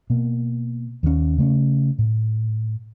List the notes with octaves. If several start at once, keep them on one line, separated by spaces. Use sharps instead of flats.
B2 A#3
D#2 D#3 F#3 C#4
C#3 A3 C4 C#4
A2